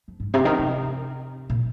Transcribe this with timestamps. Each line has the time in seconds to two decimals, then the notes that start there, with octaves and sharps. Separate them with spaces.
0.08 F2
0.20 G#2
0.34 C3
0.45 D#3
0.59 C3
1.50 A#2